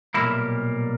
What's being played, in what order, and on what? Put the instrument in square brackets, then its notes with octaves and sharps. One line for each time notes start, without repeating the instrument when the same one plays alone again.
[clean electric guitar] B1 A#2 G3 A#3 E4